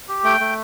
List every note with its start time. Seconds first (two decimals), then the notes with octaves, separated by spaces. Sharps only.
0.08 G4
0.24 A3 G5
0.41 A3